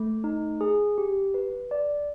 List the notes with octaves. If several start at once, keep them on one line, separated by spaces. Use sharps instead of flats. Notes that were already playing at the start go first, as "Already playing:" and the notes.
Already playing: A3
D#4
G#4
G4
B4
D5